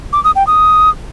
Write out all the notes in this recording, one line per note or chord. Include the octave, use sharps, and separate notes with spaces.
D6
D#6
G5
D#6